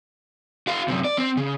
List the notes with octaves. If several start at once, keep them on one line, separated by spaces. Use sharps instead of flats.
F#4 F5
F#2 C3
D5
C4
C#3